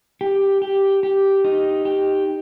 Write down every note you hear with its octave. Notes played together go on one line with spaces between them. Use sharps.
G4
G4
G4
D#4
G4